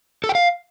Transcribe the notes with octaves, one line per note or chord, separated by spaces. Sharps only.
A4
G5
F5